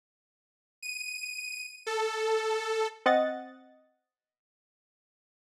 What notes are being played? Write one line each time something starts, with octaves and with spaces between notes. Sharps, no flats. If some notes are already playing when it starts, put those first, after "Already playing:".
D#7
A4
C4 D#5 F#5 A6